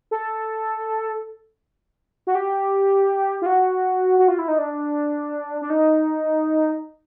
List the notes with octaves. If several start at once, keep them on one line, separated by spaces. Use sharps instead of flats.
A4
F#4
G4
F4
F#4
F#4
F4
E4
D#4
D4
D4
D#4